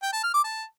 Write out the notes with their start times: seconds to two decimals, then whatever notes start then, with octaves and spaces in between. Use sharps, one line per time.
0.03 G5
0.13 A5
0.23 F6
0.34 D6
0.44 A5